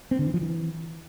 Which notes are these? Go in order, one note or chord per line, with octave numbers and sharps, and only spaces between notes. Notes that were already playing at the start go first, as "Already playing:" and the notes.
C4
D3
E3
F3
E3